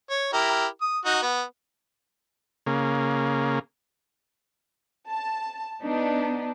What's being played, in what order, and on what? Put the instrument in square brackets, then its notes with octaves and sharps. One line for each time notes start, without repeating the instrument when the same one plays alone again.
[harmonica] C#5
E4 G4 A#4
D#6
D#4 F#4
B3
[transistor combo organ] C#3 A#3
[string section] A5
B3 D4 D#4